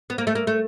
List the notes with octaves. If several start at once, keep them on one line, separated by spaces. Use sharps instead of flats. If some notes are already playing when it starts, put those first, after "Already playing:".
B3
A#3
A3
A#3
A3